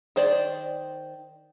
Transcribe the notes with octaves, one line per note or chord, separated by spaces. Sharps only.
D#3 C5 D5